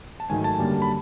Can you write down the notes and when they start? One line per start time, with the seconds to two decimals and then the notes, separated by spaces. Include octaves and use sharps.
0.20 A5
0.30 G#2 D#3 F#3 A3 G#5
0.44 A5
0.59 F#2 D3 G3 A#3
0.82 B5